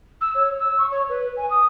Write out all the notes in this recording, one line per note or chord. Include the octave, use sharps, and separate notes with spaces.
E6
C#5
E6
C#6
C#5
B4
G#5
D#6